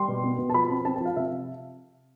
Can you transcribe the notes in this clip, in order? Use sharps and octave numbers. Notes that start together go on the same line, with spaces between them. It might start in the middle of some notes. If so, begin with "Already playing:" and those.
Already playing: G3 C6
B2
B3
B2
A5
F3 B5
C4
C4 A5
A5
F3 F5
C3 E5